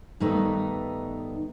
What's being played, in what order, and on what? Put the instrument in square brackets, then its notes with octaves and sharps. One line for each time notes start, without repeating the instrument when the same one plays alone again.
[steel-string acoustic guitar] G2 D#3 A3 B3 D#4